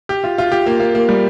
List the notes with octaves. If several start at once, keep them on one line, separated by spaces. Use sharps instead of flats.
G4
F4
F4
G4
A#3
A#3
A#3
G3